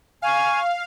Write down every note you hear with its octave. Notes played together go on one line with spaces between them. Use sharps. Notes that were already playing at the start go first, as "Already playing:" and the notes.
F5 G#5 C#6